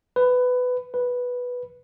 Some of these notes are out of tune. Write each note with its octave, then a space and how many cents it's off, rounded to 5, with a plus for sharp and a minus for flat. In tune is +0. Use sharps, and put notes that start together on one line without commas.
B4 +15
B4 -5